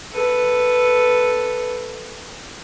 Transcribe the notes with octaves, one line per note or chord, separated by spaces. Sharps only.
A4 B4